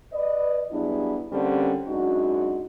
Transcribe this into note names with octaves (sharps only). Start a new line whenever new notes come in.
B4 D5 D#5
G2 F#3 B3 D4 E4 G#4
D3 G3 A#3 C4 C#4
F#2 G#3 D4 D#4 F#4